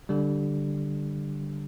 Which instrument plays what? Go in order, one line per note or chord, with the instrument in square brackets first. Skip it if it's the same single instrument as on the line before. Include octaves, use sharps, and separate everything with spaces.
[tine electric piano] D3 G3